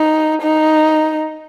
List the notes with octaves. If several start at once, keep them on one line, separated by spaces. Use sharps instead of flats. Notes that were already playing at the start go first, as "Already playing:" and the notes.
Already playing: D#4
D#4